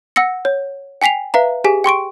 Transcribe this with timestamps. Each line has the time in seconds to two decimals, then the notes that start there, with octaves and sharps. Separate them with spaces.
0.16 F#5 E6 A#6 C#7
0.45 C#5
1.02 G5 G#5 B6 C7 F7
1.34 B4 E5 F5 A#5
1.64 G4 G#4 G#5 B6
1.84 G5 C6 C#6 D7